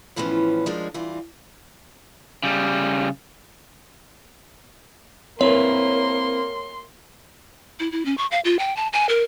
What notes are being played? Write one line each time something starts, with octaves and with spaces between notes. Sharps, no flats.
D2 A2 E3 F3 B3 C#4
F3 G3 G#3 D4 A#4 C#5
E3 G3 F4
C#3 G3
A#3 C4 E4 A#4 B4 C#5 C6
E4
E4
C#4
C#6
F5
F4
G5
A5
G#5
A#4